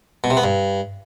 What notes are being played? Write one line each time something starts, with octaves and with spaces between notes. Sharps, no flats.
B2
C3
B3
G2